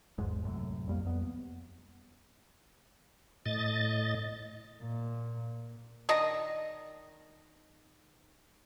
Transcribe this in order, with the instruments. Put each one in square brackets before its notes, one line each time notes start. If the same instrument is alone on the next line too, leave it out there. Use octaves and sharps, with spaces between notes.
[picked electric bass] G#1 E2 G#2 G#3
C2 F#2 A2
F2 G3 A#3
F2 B3
[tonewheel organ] A2 D#5 A6
[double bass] A#2
[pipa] D#3 D4 D#5